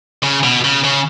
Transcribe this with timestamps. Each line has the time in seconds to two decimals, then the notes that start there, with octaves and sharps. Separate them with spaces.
0.23 C#3
0.43 B2
0.64 C#3
0.84 C#3